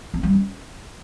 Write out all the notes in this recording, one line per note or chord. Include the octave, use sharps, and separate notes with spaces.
C4
G3
C#4